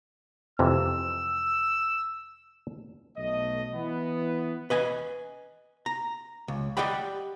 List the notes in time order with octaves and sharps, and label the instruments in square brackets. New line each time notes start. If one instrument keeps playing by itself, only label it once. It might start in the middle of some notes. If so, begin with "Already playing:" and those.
[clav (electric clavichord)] F2 C3 E3 [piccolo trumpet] E6
[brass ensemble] B1 A3 D#5
E3 B3
[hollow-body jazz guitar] B4 D#5 G#5
A#5
C#2
G4 D5 D#5 F#5 G5 B5